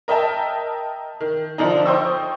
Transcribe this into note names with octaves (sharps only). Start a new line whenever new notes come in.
A#4 D#5 E5 G5 A5
D#3
D3 F3 D4 D#4
C5 D#5 G5 C#6 D#6 E6